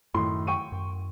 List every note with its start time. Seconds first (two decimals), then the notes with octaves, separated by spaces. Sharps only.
0.14 F#2 A2 D#3 C6
0.47 G5 C#6 D#7
0.72 F#2